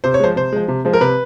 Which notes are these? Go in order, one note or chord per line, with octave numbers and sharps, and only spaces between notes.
C3 C5
C#5
F3 G#3 C5
C3 C5
F3 G#3
C3
F3 G#3
A#4
C3 B4